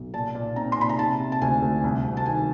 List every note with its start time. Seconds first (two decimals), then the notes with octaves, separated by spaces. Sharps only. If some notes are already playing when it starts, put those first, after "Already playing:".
Already playing: B1
0.14 A#2 A5
0.35 A#2
0.56 C4 A#5
0.72 C6
0.77 A#2 B5
0.89 A#5
0.99 C3 A5
1.20 C3
1.32 A5
1.42 D2 G#5
1.62 D2
1.84 C2
2.05 C2
2.17 A5
2.26 D#3 G#5